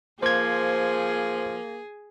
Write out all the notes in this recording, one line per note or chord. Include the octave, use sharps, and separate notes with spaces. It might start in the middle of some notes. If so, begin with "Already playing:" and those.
F3 A#3 G#4 C5 G#6